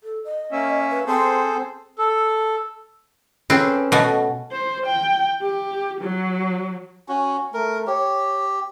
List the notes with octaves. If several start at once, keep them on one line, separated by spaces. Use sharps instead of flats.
A4
D#5
A#3 C#4 E5
B4
C4 G#4 A4 C5
A4
C4 C#4 G#4 A4 B4
B2 A3 F#4
C5
G5
G4
F#3
C#4 F#4 G#5
A3 A#4
G4 C#5